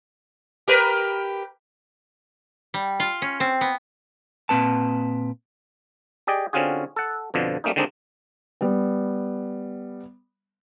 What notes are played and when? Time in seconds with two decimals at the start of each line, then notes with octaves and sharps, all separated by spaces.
0.68 G4 A#4 B4
2.74 G3
3.00 F4
3.22 C#4
3.40 C4
3.61 B3
4.49 A#2 E3 C4 B4 A5
6.27 G4 G#4 D5 D#5 G5
6.53 D3 C4 C#4 F4 F#4 G#4
6.96 A4 F#5
7.34 F2 B2 D3 F3
7.64 G3 A3 A#3 C#4 D#4
7.76 D3 D#3 G#3 C4 D4 D#4
8.61 G3 B3